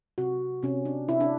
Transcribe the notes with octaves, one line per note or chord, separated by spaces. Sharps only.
C3 F#4
C3 C#4
D4
C3 E4
D4